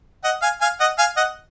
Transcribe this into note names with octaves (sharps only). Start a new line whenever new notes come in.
D#5 F#5
F5 G#5
F5 G#5
D#5 F#5
F5 G#5
D#5 F#5